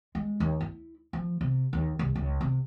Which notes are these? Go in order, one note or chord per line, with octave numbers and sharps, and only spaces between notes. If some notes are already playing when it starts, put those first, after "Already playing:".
G#3
D#2
E4
F3
C3
D#2
C2
C#2
C3